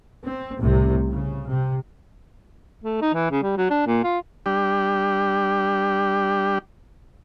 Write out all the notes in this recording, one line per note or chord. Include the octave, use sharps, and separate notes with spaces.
C4
C2 A2 C3
C#3
C3
A3
D#4
E3
C#3
G3
F#3
D4
A#2
F4
G3 D4 G4